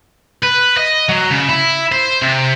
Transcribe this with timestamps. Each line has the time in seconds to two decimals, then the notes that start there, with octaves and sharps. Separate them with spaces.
0.43 B4
0.77 D#5
1.09 F#3
1.31 C#3
1.48 E4
1.92 C5
2.22 C3